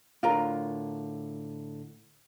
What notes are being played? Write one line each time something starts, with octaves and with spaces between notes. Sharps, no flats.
A2 D3 F4 A#4 A#5